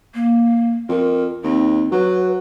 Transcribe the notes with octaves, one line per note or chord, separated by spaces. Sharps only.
A#3
F2 A#4
D#2 C4
F#3 B4